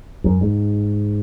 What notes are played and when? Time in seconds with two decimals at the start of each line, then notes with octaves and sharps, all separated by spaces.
0.24 F#2
0.41 G#2